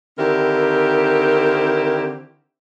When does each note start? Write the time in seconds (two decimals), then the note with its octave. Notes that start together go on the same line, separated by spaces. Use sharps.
0.19 D3 D#3 C4 E4 G4 A#4